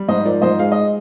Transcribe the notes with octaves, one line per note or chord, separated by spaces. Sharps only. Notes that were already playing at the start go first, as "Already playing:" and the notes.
Already playing: G3
G#2 C5 D#5
F3 A#4 D5
G#2 C5 D#5
G#3 F5
D#5